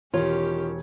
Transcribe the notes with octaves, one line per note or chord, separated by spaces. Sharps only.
E1 D#3 C#4 F4 G4 C#5